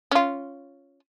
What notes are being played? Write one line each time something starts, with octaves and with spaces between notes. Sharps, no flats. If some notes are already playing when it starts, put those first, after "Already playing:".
C#4 F4